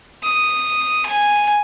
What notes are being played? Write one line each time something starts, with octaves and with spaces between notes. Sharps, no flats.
D#6
G#5